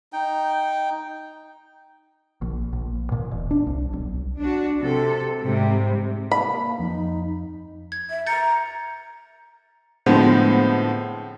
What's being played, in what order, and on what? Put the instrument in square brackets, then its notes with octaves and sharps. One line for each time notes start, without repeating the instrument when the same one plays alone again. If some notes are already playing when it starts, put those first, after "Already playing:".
[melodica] D#4 G5
[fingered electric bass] A#1
A#1
A#2
E1
D4
C2
B1
[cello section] D4 F#4
C3 A4
G#2 C3 G3
[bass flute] A#3 [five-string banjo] B5
[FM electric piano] F2 [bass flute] D#4
[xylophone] G#6
[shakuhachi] E5
[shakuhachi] A#5 [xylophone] G6 A6 C#7
[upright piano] A2 D3 F3 G#3 B3 C4